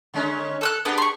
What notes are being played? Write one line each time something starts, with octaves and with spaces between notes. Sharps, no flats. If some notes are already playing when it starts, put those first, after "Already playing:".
D3 G#3 C#4
A4 E6 F#6
B3 D4 G4 G#4
C6 C#6